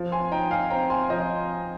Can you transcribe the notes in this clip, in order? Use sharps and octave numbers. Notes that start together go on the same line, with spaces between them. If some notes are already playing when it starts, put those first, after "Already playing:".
Already playing: F3
G#5 C6
D#4 G5 A#5
F5 G#5
C4 G5 A#5
G#5 C6
F3 C5 D#5